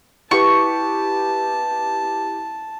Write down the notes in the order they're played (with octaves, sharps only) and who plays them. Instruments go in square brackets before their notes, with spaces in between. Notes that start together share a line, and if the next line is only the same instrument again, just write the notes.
[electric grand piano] E4 G4 B4 [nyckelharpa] A5 [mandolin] C#6